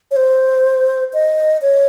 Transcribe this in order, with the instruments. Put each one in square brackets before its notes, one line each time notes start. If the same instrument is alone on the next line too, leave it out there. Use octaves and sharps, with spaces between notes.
[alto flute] C#5
C5
D#5
C#5